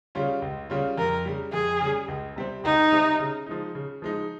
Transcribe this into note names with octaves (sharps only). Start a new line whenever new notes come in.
C#3 G3 C#4 F4
C#2
C#3 G3 C#4 F4
F2 A#4
C#3 G3
F2 G#4
C#3 G3
C#2
C3 G3 C4
C#2 D#4
C3 G3 C4
C#3
F3 G#3 D#4
C#3
F3 G#3 D#4